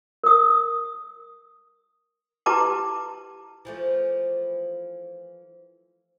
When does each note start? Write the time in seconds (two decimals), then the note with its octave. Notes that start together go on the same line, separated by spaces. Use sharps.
0.24 A#4 D#6
2.46 E4 G4 B4 A5 A#5 D6
3.65 E3 F3 A3